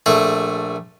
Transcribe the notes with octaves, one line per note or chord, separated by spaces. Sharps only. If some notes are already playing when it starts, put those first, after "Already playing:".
A#1 A3 G#4